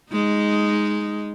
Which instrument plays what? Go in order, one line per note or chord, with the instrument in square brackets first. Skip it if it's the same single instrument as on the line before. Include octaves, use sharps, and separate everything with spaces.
[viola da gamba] G#3 D#4